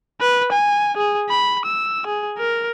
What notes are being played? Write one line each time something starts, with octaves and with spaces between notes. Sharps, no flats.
B4
G#5
G#4
B5
E6
G#4
A#4